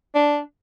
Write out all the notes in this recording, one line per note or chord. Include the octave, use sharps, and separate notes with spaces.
D4